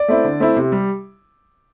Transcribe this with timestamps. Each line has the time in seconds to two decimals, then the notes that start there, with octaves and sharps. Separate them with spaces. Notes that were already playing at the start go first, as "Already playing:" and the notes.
Already playing: D5
0.08 A3 C4 E4
0.24 D3
0.40 A3 C4 E4
0.57 C3
0.72 G3